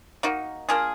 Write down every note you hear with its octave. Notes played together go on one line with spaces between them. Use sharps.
A#3 D#4 F#4
A#3 D4 F4 G#4